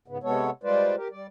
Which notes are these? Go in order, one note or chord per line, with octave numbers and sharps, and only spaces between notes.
G#2 C#3 B3
C3 G#3 B3 A4 C#5
G3 G#3 F4 B4 C5 D5
G4 A#4
G3 D5